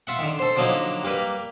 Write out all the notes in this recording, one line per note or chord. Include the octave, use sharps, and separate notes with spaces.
F4 E5 F#5
D3 D#3
A4 C5
D3 F3 F#3 A#3 D#4 E4
G3 A#3 A#4 B4